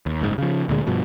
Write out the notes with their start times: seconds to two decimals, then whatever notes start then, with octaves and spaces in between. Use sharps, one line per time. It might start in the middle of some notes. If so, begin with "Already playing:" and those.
0.06 D#2
0.21 F#1 G#2
0.38 C#3 F3
0.68 D2 A#2 D3 G#3
0.87 G2 B2 F3